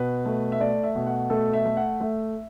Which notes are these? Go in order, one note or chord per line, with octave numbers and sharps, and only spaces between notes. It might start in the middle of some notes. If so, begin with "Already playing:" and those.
Already playing: B2 B4
A3
E5
A3 D5
E5
B2
F#5
A3 A4
E5
A3
F#5
A3 E5